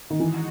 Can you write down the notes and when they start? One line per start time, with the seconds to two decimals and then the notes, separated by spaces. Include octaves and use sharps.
0.10 D#3
0.20 E3 G#3 D#4 F#4